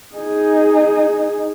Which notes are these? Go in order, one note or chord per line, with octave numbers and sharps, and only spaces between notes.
D#4 G#4